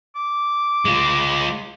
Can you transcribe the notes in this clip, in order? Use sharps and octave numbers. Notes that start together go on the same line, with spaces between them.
D6
G#3 F4